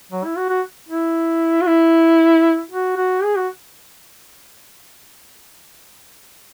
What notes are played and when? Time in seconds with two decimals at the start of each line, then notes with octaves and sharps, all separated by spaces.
0.12 F#3
0.25 E4
0.37 F#4
0.50 F#4
0.89 E4
1.62 F#4
1.67 E4
2.71 F#4
2.97 F#4
3.23 G#4
3.36 F#4